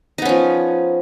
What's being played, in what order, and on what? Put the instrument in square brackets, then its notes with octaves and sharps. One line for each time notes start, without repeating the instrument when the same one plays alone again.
[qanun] D#4
B3
C#4
F3